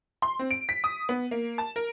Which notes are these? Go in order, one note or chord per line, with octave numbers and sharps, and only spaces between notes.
C6
C4
D7
B6
D#6
B3
A#3
A5
A#4